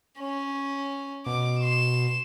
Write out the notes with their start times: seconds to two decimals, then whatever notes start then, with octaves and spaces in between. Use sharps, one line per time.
0.19 C#4
1.26 B2 D6
1.60 C6 E7